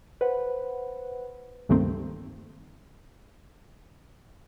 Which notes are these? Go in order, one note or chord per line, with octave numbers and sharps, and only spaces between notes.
B4 C5 F#5
C#2 G2 D#3 A3 A#3 C4